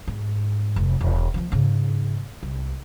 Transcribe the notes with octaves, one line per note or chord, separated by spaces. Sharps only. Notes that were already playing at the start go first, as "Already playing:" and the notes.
G#2
F1
E1
F3 A#3
G#2 C#3
C2